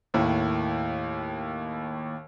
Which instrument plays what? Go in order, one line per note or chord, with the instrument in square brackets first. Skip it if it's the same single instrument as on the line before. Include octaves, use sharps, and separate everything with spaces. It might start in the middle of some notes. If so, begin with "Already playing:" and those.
[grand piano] D#2 A2